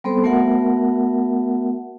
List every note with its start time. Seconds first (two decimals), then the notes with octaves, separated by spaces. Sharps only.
0.04 G3 B3 C4 A4 C5 C6
0.24 A3 B3 F#4 A#4 E5 F#5